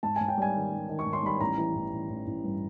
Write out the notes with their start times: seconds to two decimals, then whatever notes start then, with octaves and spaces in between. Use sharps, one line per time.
0.03 G#2 A5
0.16 G#2 G#5
0.28 G5
0.37 G3 G#5
0.54 D#3
0.72 G3
0.89 D#3
0.99 C#6
1.06 G#2
1.13 C6
1.23 G3 B5
1.41 A1 A#5
1.58 E3
1.75 A1
1.92 A1
2.10 A1
2.27 A1
2.44 G2